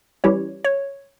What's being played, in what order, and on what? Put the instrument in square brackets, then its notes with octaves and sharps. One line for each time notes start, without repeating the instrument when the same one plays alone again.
[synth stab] E3 G3 C#4 [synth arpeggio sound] C#5
[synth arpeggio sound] C#5